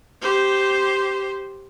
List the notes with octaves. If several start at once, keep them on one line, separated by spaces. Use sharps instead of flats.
G4 C5